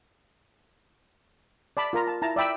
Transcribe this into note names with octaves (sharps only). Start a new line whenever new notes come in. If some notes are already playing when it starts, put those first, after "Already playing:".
D5 A5 B5
F4 A#4 A#5
A5
E4 A5 A#5
D5 E5 G5 B5 E6